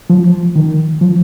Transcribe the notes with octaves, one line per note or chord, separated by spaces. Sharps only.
F3
D#3
F3